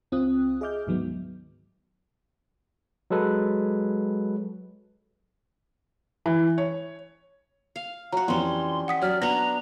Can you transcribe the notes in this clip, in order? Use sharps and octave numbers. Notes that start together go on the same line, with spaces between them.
C#2 C4 F4 D#6 F#6
G#4 D#5 E5 D6 F6 G6
D2 G#2 D#3 F#3 B3
F#3 G#3 A4 B4
E3
C#5
F5
F#3 F#4 A#5
F2 E3 G3 C#4 C6
F#5 D#6 B6
F#3 C#5 D5 F6
B3 D4 F#4 A#5 A#6